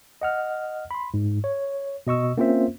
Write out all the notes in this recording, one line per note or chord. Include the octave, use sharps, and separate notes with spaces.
D#5 F#5 F6
B5 C6
G#2
C#5
B2 D#5 C#6 E6
A#3 C4 C#4 F4 C5 E5